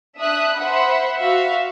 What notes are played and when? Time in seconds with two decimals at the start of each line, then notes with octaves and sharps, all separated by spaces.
0.17 D4 E5 D#6 F#6
0.58 C5 E5 F#5 B5
1.19 F#4 E5 F5